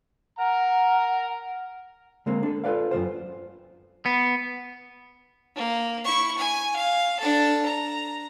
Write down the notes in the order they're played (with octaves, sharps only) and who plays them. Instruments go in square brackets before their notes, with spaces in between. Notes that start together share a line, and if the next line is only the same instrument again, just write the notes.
[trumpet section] A#4 A#5 [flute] F#5
[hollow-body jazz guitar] D3 G#3 A#3 C4
D4 A4
F4 A4 B4 D5 F5
F#2 E3 F4 C5
[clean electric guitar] B3
[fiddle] A#3
E4 C#6
G#5
F5
D4 A4
A#5